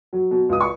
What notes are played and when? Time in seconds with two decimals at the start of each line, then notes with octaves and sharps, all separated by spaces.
0.13 F#3
0.31 B2
0.49 C#2 D#6
0.61 C#6